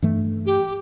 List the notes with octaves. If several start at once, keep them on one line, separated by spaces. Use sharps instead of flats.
G2 E3 A3
G4